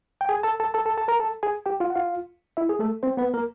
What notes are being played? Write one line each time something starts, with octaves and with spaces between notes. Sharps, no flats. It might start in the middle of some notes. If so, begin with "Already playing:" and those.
G5
G#4 G#5
A4 A5
A4 A5
A4 A5
A4 A5
A4 A5
A#4 A#5
A4 A5
G#4 G#5
G4 G5
F4 F5
F#5
F4 F5
E4 E5
G#4
A3 A4
C4 C5
B3 B4
A#3 A#4